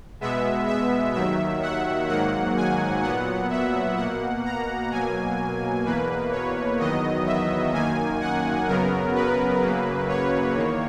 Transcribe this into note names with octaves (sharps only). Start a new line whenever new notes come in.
B2 G#3 B3 E5
E5
D#2 D#3 F#3 E5
F#5
G#2 D#3 F#3 A#3 F#5
G#5
A#2 F#3 B3 F#5
E5
B2 A#3 F#5
A#5
B2 F#3 A#3 G#5
E2 B2 A#3 B4
C#5
E2 D#3 F#3 B3 D#5
E5
F#2 D#3 A#3 G#5
F#5
F#2 C#3 F#3 B3 A#4
B4
F#2 C#3 F#3 A#3
C#5
E2 D#3 A#3